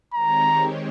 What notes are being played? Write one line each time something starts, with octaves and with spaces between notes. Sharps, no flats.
D#3 G#3 C4 G4 C#5 A#5